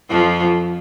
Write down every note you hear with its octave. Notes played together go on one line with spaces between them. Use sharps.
F2 F3